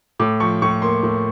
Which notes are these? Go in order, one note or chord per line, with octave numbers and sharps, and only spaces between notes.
A2 D6
F3 C#6
A2 C#6
A#3 C6
A2